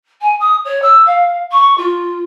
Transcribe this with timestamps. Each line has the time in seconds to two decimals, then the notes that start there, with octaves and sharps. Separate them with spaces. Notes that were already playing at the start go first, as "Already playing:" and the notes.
0.21 G#5
0.40 D#6
0.65 C#5
0.82 E6
1.05 F5
1.51 C#6
1.77 F4